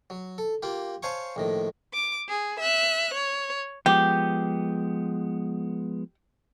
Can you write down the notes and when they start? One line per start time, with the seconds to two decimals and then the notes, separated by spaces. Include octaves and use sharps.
0.10 F#3
0.38 A4
0.63 A#3 F4 G4
1.03 C5 C#5 F5 G#5 A5 C#6
1.36 A#1 A2 D#3
1.94 D6
2.29 G#4
2.59 E5 F#6
3.14 C#5
3.86 F3 G#3 B3 G4